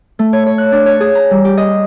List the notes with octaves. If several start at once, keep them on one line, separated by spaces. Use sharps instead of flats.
A3
C#5
C#5
F#6
D4
C#5
G#4
A#5
G3
G4
D#5